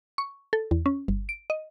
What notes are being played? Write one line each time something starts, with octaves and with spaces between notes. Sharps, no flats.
C#6
A4
E2
C#4
G1
D7
D#5